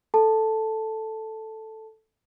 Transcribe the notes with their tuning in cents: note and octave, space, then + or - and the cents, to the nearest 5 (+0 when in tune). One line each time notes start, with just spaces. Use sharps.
A4 +0 A5 +0